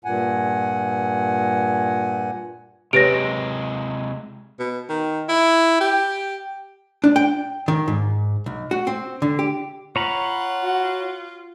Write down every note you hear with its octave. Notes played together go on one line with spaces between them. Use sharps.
G2 A#2 F#5 G#5
C3 G#3 G4 B4 C#5 A#6 D7
B2
D#3
E4
G4
D4
G5
D#3
G#2
B1
F#4
C4
D3
G4
F4 C#5 F#5 A#5 B5
F#4